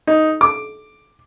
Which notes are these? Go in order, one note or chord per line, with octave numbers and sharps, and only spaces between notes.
D#4
D6